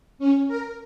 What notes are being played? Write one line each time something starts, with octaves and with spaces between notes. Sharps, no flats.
C#4
A#4